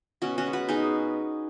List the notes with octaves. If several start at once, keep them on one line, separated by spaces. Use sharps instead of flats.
B2 C#4 F#4
C#4 F#4
G#3 B3
F#4 B4
B2 D#4 G#4